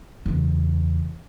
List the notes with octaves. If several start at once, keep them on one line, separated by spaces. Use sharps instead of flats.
F#1 E2